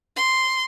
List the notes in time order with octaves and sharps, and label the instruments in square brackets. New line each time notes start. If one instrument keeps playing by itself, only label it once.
[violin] C6